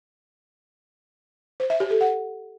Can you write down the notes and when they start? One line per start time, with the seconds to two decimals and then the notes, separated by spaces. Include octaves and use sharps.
1.60 C5
1.70 E5
1.80 G4
1.91 A4
2.01 F#5